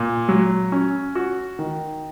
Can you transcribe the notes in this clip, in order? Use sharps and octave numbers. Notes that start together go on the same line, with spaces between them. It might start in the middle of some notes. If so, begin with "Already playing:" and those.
Already playing: A#2
F#3
C#4
F#4
D#3